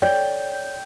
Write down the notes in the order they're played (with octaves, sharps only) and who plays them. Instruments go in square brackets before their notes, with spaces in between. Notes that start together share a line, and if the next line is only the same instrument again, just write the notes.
[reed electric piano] C#5 [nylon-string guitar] D5 [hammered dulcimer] G5